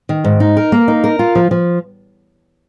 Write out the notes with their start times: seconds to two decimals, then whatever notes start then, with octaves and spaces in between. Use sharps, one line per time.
0.09 D#3
0.24 G#2
0.40 D#4
0.57 A#4
0.72 A#3
0.88 D#4
1.04 A#4
1.19 F4
1.35 F3
1.51 F3